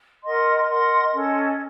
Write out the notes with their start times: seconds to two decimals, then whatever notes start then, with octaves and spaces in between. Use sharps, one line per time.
0.24 A#4 D#5 F#5 C6
0.69 A#4 D#5 F#5 C6
1.13 C#4 A4 D#5